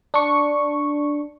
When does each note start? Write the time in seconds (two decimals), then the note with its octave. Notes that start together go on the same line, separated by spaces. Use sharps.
0.14 D4 C#6